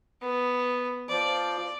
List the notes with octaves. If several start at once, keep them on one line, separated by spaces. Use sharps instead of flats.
B3
F3 D5